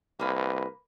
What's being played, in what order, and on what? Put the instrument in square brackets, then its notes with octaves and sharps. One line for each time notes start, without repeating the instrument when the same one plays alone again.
[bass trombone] C2 [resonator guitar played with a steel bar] A#3 B4